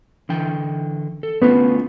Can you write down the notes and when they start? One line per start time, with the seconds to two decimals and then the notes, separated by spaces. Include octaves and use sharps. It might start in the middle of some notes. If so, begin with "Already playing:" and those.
0.29 D3 E3 G5
1.23 A4
1.42 A3 B3 C#4 F4